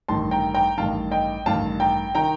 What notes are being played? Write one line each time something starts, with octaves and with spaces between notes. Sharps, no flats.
A1 G2 D#3 A5 C6
G5 A#5
G5 A#5
A1 G2 D#3 F5 A5
D#5 G5
A1 G2 D#3 F5 A5
G5 A#5
D#3 G5 A#5